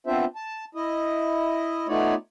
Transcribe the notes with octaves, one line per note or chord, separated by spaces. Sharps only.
B3 C4 D4 F4 C5 E5
A5
E4 D#5
A3 B3 D#4 F4 C#5 D5